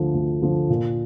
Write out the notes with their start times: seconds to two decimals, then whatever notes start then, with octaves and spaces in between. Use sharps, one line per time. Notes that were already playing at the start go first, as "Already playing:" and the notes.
Already playing: D2 D3 F3
0.14 D2
0.42 D3 F3
0.70 A#2